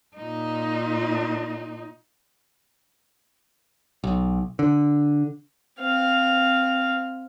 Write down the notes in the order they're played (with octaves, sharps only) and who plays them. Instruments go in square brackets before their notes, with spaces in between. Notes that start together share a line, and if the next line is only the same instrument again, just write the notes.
[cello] A#2 D#4
[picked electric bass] B1
D3
[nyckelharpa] C4 F5